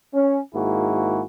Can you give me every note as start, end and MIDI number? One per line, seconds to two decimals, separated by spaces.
0.14 0.39 61
0.55 1.22 32
0.55 1.22 44
0.55 1.22 58
0.55 1.22 64
0.55 1.22 66
0.55 1.22 68